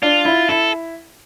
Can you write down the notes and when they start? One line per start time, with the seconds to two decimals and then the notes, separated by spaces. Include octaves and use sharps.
0.02 D4 F4
0.25 E4
0.49 E4 A4